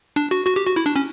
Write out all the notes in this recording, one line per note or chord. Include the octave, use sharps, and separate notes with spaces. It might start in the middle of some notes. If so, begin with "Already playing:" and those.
D4
F#4
F#4
G4
F#4
E4
D4
C#4